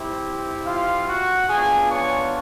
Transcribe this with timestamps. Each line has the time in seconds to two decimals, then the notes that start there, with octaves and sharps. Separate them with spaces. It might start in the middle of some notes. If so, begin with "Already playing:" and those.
Already playing: C4 E4 G4
0.66 F4 F5
1.08 F#4 F#5
1.49 B3 D4 F4 G#4 G#5
1.91 C#5 C#6